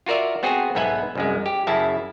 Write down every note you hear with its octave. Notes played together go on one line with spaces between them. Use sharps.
F4 F#4 A#4 D5 E5
B3 C4 F#4 G#4
B1 G#2 B3 B4 E5 G#5
C2 F#2 G#3
G4
F#2 C#3 E4 E5 A5